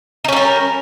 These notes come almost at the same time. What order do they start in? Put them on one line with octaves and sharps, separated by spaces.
D#4 C#4 G3 A#4